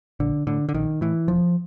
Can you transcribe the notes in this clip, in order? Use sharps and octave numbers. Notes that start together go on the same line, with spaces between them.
A#1 D3
A2 D3
D3
A#1 D#3
A2 E3
E1 F3